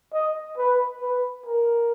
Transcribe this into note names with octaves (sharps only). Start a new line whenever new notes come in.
D#5
B4
B4
A#4